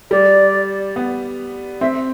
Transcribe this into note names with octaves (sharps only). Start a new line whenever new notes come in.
G3 D5
B3
C4 E5